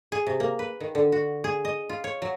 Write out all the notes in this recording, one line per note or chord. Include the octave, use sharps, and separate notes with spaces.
G#4
C3
A#3
B4
D#3
D3
F#4
G#4
D#5
F4
C#5
F#3